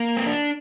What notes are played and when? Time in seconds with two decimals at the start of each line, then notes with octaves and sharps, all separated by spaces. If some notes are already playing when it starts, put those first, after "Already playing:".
Already playing: A#3
0.17 C4
0.26 D4